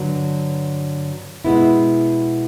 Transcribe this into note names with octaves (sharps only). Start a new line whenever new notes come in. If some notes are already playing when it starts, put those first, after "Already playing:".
Already playing: G2 D3 F#3
B2 G#3 B3 E4